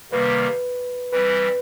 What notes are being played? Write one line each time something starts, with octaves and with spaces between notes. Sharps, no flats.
C3 D#3 G3 A#3 B4
E3 G3 C4 B4